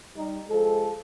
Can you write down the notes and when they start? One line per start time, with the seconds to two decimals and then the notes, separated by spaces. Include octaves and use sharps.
0.16 G3 D#4
0.48 F3 G#3 A4